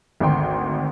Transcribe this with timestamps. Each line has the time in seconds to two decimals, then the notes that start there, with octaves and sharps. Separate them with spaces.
0.20 G#1 D2 G5 C6